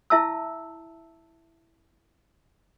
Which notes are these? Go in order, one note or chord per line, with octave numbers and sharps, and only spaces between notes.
E4 E5 A5 E6